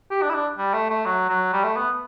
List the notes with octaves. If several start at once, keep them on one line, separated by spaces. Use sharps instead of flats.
G4
D4
E4
D4
G3
A3
A3
F#3
F#3
G3
A3
B3